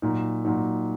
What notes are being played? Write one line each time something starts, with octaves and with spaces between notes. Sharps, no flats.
A#2 F#3 D#4
A#2 F#3 D#4